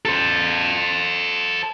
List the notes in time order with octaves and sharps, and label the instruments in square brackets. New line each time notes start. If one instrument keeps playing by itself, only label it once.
[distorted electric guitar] A4 C5